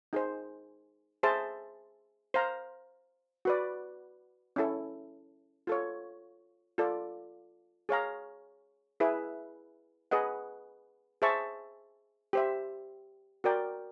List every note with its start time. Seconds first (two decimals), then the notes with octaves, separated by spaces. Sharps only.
0.13 D#4 G#4 C5
1.23 G#4 C5 E5 A5 C6
2.34 C5 F5 A#5
3.45 F#4 B4 D5
4.56 C#4 E4 A4
5.67 F4 A4 C#5
6.78 F4 A4 D5
7.89 G#4 C#5 F5 A#5
9.00 E4 G#4 B4 E5
10.11 G#4 B4 D#5 F#5
11.22 G#4 C5 E5 A5 C#6
12.33 G4 C5 E5
13.44 F#4 A#4 D5 G5